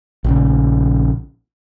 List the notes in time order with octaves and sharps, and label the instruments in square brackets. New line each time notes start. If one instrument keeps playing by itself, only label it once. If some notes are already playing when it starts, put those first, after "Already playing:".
[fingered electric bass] A#1 C#3